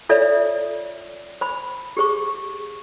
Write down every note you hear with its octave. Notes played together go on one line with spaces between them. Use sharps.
F4 A4 C#5 D5 E5
C5 B5
G4 G#4 C5 C#6